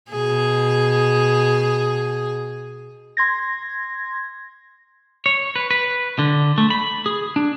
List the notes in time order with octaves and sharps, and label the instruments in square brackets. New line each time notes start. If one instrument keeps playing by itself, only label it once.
[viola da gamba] B2 G#4
[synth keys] C6 G#6 A#6
[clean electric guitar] C#5
B4
B4
D3
A3
B5
G#4
D4